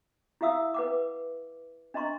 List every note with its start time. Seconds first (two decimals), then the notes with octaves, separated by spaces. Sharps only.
0.41 E4 G4 E5 F5 D#6 E6
0.74 B4 F#5 D6
1.94 D4 D#5 A#5 C6 C#6